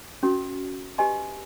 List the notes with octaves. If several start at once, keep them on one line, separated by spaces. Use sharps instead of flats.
C#4 F#4 A#4
G4 B4 D#5 G#5 C6